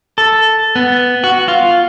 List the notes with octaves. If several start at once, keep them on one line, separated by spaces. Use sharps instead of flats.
A4
B3
F#4
F4